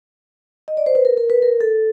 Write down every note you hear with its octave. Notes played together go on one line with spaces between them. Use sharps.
D#5
D5
C5
B4
A#4
A#4
B4
A#4
A4